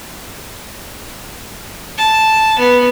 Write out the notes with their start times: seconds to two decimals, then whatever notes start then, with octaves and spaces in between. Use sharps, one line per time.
1.98 A5
2.59 B3